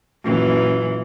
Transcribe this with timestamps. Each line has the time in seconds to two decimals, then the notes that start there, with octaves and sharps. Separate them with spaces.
0.23 F#2 A#2 E3